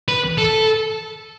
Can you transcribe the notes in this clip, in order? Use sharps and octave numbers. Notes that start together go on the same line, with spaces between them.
B4
A4